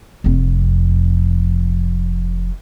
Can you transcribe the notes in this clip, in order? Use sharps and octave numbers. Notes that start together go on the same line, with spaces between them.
F1 F2